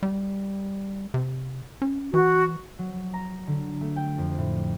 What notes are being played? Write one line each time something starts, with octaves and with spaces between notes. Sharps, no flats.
G3
C3
C#4
E3 F#4
F#3
A#5
D3
A3
G5
F2
A2